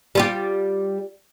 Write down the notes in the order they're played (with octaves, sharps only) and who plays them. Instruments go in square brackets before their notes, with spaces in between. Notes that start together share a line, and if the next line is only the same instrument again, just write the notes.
[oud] G3 F4 G4